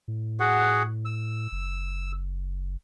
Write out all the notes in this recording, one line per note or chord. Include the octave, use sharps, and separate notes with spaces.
A2
F#4 G#4 F#5
E6
F#1